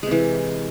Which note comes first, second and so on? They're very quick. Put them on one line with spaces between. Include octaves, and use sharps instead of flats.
G#3 C3 E3